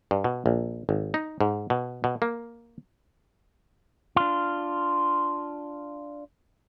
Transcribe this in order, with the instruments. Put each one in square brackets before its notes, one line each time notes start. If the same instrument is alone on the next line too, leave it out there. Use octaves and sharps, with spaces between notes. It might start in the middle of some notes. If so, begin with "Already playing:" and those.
[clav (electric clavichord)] G2
B2
A#1
G#1
D#4
G#2
B2
B2
A#3
[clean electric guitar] D4 F4